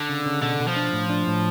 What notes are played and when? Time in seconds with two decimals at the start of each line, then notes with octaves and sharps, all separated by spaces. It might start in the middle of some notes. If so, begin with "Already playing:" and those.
Already playing: D3
0.09 C#3
0.26 C#3
0.42 B2 D3
0.60 B2
0.68 F3
0.76 D4
0.93 A2
1.09 D4
1.27 A2